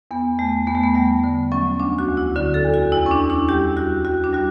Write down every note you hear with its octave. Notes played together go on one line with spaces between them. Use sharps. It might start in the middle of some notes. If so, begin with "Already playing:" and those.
E2 B3
E2 A3
E2 B3
A3
B3
G3 A3
D3
F#3 C#4
D2 D4
F#4
D2
E4
D3 F#4
A4
E2
F#4
E2 E4
C#4
D4
E2
E4
G3 G4
G3 F#4
G3 F#4
D4
G3 F#4